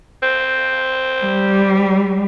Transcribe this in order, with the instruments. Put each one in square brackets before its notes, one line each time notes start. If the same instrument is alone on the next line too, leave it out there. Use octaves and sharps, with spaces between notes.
[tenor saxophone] C4
[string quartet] G3